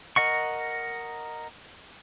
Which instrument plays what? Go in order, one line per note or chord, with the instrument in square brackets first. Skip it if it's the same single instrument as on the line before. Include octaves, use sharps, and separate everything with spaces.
[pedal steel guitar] A#4 D#5 F#5 C#6